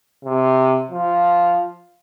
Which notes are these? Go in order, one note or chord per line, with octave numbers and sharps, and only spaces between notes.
C3
F3